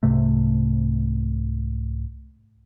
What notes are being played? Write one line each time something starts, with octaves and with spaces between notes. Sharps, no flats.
C2 G#2 C3 A3